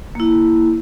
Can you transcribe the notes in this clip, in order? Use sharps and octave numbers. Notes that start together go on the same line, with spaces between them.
A#3 E4